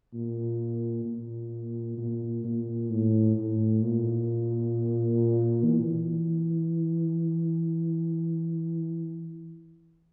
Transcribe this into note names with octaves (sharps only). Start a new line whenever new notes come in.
A#2
A#2
A#2
A#2
A2
A2
A#2
E3